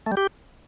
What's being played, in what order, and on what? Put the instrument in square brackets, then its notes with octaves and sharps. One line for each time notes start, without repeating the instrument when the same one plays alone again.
[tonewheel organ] A3
G3
G4